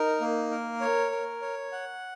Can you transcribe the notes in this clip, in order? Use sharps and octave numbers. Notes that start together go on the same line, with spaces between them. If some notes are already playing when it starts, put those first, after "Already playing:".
Already playing: D#4 A#4
A#3
A#4
C#5
A#4
C#5
F#5